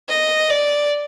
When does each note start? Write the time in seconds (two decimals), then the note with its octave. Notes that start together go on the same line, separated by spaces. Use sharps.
0.09 D#5
0.50 D5